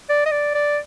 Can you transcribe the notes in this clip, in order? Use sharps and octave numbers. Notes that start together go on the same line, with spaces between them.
D5
D#5
D5
D5